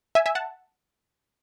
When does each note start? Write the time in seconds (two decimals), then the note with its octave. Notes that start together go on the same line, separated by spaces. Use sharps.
0.15 E5 G#5
0.26 E5 G#5
0.35 F#5 A5